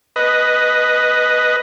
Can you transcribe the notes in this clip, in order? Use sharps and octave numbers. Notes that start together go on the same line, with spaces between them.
B4 D#5